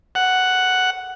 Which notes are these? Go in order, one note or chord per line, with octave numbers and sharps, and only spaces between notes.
F#5